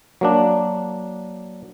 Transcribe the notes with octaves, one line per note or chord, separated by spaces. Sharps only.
F#3 A#3 D4